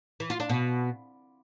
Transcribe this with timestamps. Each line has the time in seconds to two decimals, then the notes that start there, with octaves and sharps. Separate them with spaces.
0.20 E3
0.30 F4
0.40 D4
0.49 B2